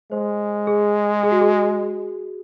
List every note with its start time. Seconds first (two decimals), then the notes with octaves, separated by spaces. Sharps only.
0.12 G#3 C5
0.67 G#4
1.23 G#4
1.32 F#4
1.41 G#4